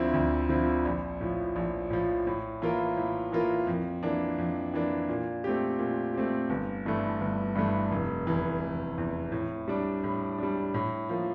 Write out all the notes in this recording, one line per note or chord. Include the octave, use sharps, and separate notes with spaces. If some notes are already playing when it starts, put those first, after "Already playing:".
Already playing: D2 D3 F3 C4 E4
D2
D3 F3 C4 E4
A#1
A2 F3
A#1
A2 F3
A2
E3 A#3 F4 A#4
A2
E3 A#3 F4 A#4
F2
E3 A#3 D4
F2
E3 A#3 D4
A#2
A3 C4 G4
A#2
A3 C4 G4
G1
G2 E3 A3
G1
G2 E3 A3
F1
E2 E3
F1
E2 E3
A2
G3 D4
A2
G3 D4
A2
F3 A#3